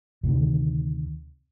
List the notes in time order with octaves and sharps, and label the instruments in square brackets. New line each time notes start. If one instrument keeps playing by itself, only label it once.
[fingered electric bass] D2 C3 D#3